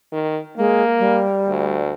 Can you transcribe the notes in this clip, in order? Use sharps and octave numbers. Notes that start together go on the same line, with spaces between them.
D#3
G#3 A#3
G3
D2